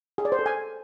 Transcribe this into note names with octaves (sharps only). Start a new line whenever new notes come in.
G#4
D5
C5
A4
G#5